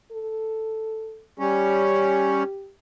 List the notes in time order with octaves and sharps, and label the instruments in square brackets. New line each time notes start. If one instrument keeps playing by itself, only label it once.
[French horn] A4
[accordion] G3 C#4 [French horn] G4